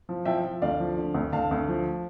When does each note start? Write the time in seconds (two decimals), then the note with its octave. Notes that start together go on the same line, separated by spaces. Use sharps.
0.09 F3
0.25 F3 E5 G5
0.44 F3
0.62 D2 D5 F5
0.80 F3
0.97 D3
1.14 D2
1.32 D2 F5 A5
1.51 D2
1.68 F3